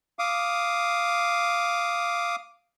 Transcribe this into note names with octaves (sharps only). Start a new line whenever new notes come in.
F5 D6 D#6